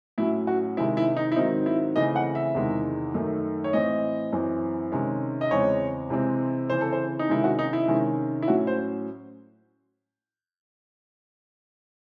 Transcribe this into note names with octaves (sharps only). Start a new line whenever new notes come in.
A2 F#3 C#4 E4
F#4
C3 D#3 G#3 C4 E4
E4
D#4
E4
G#2 D#3 F#3 C4 D#4
E4
C#3 E3 A3 C4 D#5
F#5
E5
E2 C3 D#3 G#3
F#2 D#3 A3
C#5
A2 E3 C4 D#5
F#2 E3 C4
C3 D#3 G#3 C#4
D#5
E2 C#3 G#3 C4 C#5
C3 E3 G#3 C4
C#3 E3 C4 C5
A4
C5
D#4
C3 D#3 G#3 C#4 E4
F#4
D#4
E4
C3 D#3 G#3 C#4
E4
A2 F#3 C#4 F#4
C5